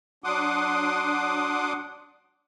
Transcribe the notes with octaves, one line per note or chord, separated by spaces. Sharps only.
F#3 D4 F#5 C6 D6 D#6